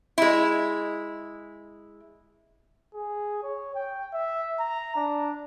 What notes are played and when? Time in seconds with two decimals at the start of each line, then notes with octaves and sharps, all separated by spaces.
0.18 G#3 E4
2.95 G#4
3.43 C#5
3.75 G5
4.13 E5
4.60 A#5
4.96 D4